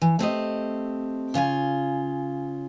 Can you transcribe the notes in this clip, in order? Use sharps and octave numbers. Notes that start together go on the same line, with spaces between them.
E3
A3 C4 G4 D#5
C#3 F4 F5 G#5